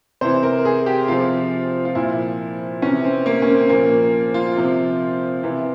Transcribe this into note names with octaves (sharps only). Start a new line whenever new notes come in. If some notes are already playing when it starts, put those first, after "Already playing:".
C3 E3 C5
A#4
G#4
G4
C3 F3 F4
F4
A#2 F3 E4
C3 E3 C#4
C4
A#3
C#4
C4
A#2 F3 A#3
F4
C3 F3
C3 E3